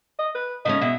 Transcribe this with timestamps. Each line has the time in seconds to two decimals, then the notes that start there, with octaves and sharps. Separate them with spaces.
0.19 D#5
0.35 B4
0.65 C#3 A3 C#4 D#5
0.81 B2 C#4 E5